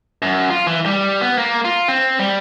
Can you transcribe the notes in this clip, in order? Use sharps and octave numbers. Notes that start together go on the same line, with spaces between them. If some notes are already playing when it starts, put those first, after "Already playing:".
F#2
F4
E3
G3
B3
A#3
F4
C4
G3